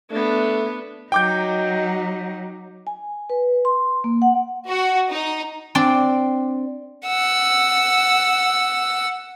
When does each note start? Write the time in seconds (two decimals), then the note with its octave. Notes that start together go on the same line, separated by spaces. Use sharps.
0.11 A3 B3 D4
1.12 F#3 D#4 G5 D6 G6
2.87 G#5
3.30 B4
3.65 C6
4.04 A#3
4.22 F#5
4.67 F#4
5.10 D#4
5.75 C4 D4 D5
7.06 F#5 E6